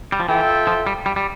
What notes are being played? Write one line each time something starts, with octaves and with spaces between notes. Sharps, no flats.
G3
F3
E3 F4 A4 E5 G5
F3
G3
G3
G3